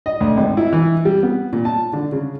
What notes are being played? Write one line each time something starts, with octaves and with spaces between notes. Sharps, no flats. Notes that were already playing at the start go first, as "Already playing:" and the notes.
D#5
D2
G#1
E4
E3
G3
B3
A#2
A5
D3
C#3